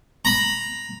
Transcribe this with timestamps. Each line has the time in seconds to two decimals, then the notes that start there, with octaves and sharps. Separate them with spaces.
0.25 A#5 B5